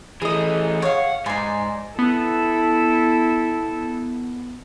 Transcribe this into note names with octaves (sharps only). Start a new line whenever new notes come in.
E3 A3 G#4 D#5
C#5 F5 F#5
G#2 D#4 D5 G#5 C6
B3 E4 A4